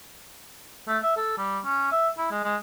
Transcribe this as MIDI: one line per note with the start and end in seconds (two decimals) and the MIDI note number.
0.88 0.98 57
1.03 1.15 76
1.17 1.38 69
1.38 1.59 55
1.65 1.88 61
1.92 2.09 76
2.18 2.27 64
2.31 2.39 56
2.43 2.56 56